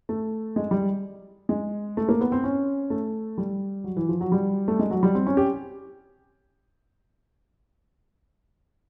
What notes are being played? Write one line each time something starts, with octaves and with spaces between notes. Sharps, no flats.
A3
G#3
G3
G#3
A3
A#3
B3
C4
C#4
A3
G3
F#3
E3
F3
F#3
G3
A3
G#3
F#3
G3
C4
C#4
G4